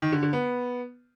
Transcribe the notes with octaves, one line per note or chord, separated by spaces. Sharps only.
D#3
D3
D3
B3